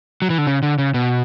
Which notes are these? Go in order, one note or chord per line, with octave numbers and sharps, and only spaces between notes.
F#3
E3
D3
C#3
D3
C#3
B2